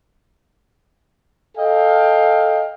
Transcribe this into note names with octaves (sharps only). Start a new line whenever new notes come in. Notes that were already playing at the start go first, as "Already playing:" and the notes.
A4 D#5 F5 G5